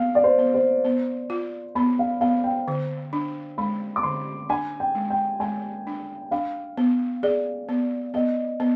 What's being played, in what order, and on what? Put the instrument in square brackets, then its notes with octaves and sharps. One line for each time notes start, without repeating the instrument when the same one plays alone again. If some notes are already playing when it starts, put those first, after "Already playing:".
Already playing: [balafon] B3 [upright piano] F5
[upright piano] D5
C5
[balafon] B3
[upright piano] C5
[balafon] B3
F4
[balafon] B3 [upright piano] B5
[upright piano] F5
[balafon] B3 [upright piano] F5
[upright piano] G5
[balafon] D3
D4
[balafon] G#3 [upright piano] B5
[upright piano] D6
[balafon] D3 [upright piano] C6
[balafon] D4 [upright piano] G#5
[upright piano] G5
[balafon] G#3
[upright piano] G5
[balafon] G#3 [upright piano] G#5
[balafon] D4
[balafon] D4 [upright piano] F5
[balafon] B3
[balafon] G#4 [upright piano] D5
[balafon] B3
[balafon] B3 [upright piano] D#5
[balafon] B3